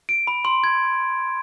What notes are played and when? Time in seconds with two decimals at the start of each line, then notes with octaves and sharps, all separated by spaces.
0.09 D7
0.27 B5
0.45 C6
0.64 G#6